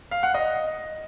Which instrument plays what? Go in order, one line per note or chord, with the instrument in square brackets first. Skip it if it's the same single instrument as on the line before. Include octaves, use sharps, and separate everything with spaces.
[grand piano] F5
F#5
D#5